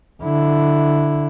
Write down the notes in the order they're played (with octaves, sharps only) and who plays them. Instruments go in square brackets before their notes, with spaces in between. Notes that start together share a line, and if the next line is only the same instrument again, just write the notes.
[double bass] D3 E4